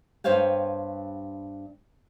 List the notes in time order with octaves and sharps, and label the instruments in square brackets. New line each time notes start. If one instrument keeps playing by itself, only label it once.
[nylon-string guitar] G2 B3 C5 C#5 F5 G5